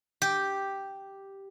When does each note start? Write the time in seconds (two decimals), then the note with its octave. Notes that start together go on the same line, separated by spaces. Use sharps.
0.22 G4